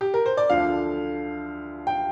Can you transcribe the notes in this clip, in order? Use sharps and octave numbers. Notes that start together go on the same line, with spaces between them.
G4
A#4
C5
D5
D2 D3 F3 F5
G5